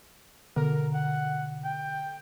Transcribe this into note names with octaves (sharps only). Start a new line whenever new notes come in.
B2 D3 A#4
F#5
G5